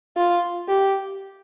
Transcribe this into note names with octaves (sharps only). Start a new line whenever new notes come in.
F4
G4